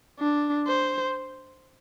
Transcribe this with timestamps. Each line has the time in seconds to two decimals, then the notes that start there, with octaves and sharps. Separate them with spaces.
0.20 D4
0.68 C5